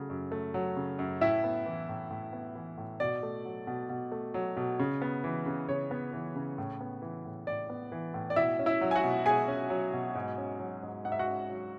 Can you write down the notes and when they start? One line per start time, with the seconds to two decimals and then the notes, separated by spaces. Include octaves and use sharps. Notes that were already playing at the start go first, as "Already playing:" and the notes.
Already playing: C#3 F#3 A3
0.10 F#2
0.32 A3
0.54 F#3
0.76 C#3
0.99 F#2
1.21 A2 E4 E5
1.44 B3
1.66 E3
1.89 A2
2.10 A2
2.33 B3
2.55 E3
2.78 A2
3.00 B2 D5
3.23 A3
3.45 F#3
3.67 B2
3.89 B2
4.12 A3
4.34 F#3
4.57 B2
4.79 C#3
5.02 B3
5.24 E3
5.46 C#3
5.68 C#3 C#5
5.91 B3
6.13 E3
6.36 C#3
6.58 A2
6.81 B3
7.02 E3
7.25 A2
7.47 A2 D5
7.70 B3
7.92 E3
8.14 A2
8.30 D5
8.36 B2 E4 E5
8.59 C#4
8.66 E4 E5
8.81 F#3
8.91 G#5
8.96 F#4 F#5
9.04 B2
9.26 B2 G#4 G#5
9.48 C#4
9.70 F#3
9.93 B2
10.15 G#2
10.38 C#4
10.60 F#3
10.83 G#2
11.05 G#2 F#5
11.12 E5
11.19 F#4 F#5
11.27 C#4
11.50 F#3